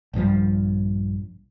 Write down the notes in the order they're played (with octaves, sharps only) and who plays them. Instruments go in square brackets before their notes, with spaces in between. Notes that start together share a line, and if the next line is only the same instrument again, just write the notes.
[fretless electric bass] A#1 G2 F3 G3